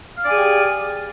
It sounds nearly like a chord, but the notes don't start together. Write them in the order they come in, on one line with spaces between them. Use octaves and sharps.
F5 D5 G#5 G#4 G4